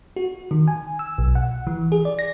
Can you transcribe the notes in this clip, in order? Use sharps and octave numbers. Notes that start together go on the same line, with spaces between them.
F#4
D#3
G#5
E6
B1
F#5
E3
G#4
D5
A#6